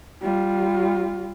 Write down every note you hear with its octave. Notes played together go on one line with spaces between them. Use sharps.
G3 F4